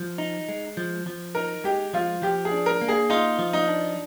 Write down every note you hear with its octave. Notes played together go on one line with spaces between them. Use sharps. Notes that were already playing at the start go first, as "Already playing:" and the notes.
Already playing: F3
D#4
G#3
F3
F3
D#4 A#4
G#3 G4
F3 F4
F3 G4
G#4
D4
A#4
A#3
G#4
D#4 F4
F3
D#4
D4